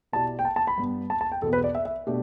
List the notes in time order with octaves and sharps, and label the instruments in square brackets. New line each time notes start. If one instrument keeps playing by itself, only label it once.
[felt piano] B2 B3 E4 G4 D5 [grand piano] A5
[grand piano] G5
A5
A5
B5
[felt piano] G2 G3 B3
[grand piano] A5
A5
G5
[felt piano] E2 B2 B3 [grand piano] A4
[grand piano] B4
D5
E5
E5
[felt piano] B2 A3 D4 G4